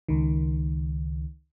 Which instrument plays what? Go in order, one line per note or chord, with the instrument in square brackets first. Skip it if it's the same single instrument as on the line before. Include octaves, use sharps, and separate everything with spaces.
[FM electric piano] C#2 D#3